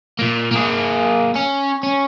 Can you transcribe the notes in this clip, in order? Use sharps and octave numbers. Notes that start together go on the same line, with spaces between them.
A#2 A#3
A#3 G#4
C#4
C#4